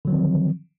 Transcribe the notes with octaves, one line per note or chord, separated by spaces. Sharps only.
D3 D#3 F3 F#3 C4